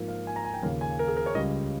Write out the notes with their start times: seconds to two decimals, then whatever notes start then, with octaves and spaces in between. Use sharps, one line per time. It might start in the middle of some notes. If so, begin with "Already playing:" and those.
Already playing: G#2 F3 A#3
0.08 F5
0.27 G#5
0.36 A#5
0.45 G#5
0.54 G5
0.63 D#2 C#3 F3 A#3 C#4 F5
0.81 G#5
0.99 A#4
1.08 G#4
1.17 A#4
1.26 C#5
1.35 C#2 C#3 G3 D#5